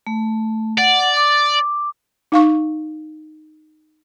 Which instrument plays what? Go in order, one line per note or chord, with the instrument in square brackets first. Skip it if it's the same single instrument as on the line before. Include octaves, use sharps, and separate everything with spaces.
[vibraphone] A3
[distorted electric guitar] D5 [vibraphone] F#5
[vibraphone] D6
[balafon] D#4 F5 C#6